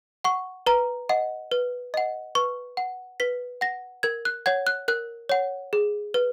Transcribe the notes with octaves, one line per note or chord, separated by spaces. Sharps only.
F#5 C#6
B4 A#5
D#5 F#5
B4
D#5 F#5
B4 C#6
F#5
B4 B6
F#5 A#6
A#4 G#6
F#6
C#5 F#5 G#6
F#6
A#4 F#6
C#5 F#5
G#4
B4